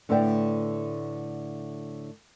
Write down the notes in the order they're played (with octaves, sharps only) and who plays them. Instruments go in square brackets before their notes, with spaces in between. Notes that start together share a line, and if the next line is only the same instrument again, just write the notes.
[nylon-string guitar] A2 D3 A3 B3 D5 G5